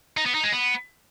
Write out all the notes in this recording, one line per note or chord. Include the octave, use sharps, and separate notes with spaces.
D#4
B3
D#4
G#3
B3